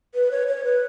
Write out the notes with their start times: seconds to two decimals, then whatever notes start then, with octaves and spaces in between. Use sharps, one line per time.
0.15 B4
0.31 C#5
0.47 C#5
0.64 B4